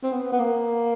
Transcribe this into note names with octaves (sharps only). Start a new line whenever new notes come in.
C4
B3
B3
A#3